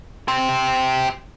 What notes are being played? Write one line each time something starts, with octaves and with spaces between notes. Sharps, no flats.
G4 C5